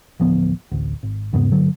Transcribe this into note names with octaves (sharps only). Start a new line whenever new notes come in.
A1 D2 F3 B3
A1 D2
G#1
E2 G#2 C#3 B3
G1 D3 F#3